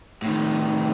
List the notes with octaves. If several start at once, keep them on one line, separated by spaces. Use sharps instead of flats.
A2 D#3